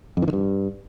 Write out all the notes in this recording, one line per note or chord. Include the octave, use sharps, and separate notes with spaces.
F2
E3
D#3
G2